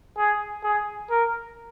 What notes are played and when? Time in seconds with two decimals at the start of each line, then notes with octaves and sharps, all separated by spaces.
0.17 G#4
0.64 G#4
1.10 A#4